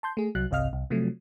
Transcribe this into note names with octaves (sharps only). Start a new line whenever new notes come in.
A5 C6 G6
A3 G#4
C2 F#3 F#6
G1 C2 C3 D#5 F5 F6
C2
C3 F3 F#3 A3